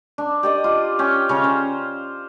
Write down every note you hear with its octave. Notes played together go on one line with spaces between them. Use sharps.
D4
G4 D5 D#5
F4
C#4 G5
C#3 C#5 F5
C5